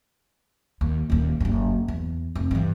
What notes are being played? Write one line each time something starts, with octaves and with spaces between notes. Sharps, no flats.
D#2
D#1 D#2
F#1 G2
E2
F1
G2 E3